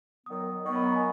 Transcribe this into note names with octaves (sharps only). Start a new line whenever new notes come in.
D#3 F#3 B3 D#6
D#3 F#3 B3 C#6
B5
A#5
G#5